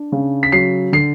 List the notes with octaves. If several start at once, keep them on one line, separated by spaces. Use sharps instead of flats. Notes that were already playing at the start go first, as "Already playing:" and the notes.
Already playing: D4
C#3
B6
F#3 C7
D3 C7